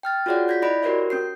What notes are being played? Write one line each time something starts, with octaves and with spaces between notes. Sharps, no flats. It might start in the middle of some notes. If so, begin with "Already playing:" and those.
G5 F6 A6
F4 F#4 G#4 C#5 D5 F#5
G6 G#6 A#6 B6
E4 D5 D#5 B5 A#6 D7
F#4 G4 A#4 C5 C#5 E5
C#4 G6 C7